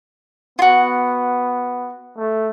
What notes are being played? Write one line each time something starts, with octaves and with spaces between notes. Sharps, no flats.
B3 F4 F#4
A3